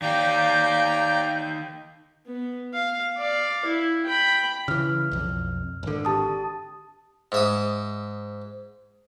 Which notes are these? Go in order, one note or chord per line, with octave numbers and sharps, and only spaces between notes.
D#3 G4 D5 F5 G5 A#5 G6
B3
F5
D5 F5
E4
G5 B5
C#3 E3 F6
B1 F2
G#1 D3
G4 A5 D#6
G#2 E5 D#6